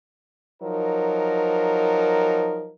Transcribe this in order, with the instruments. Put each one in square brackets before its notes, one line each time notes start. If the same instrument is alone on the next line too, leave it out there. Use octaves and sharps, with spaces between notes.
[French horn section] F3 F#3 D#4 A#4